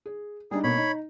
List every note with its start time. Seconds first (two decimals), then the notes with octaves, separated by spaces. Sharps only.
0.06 G#4
0.51 G3 D4 D#4 G#4
0.64 B2 A#3 C#5 B5
0.78 D#4